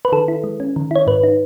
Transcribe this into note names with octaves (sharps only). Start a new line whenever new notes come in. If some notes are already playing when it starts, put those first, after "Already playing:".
B4
D#3 A4
E4
G#3
C#4
D#3
E4 C#5
G#2 B4
D#4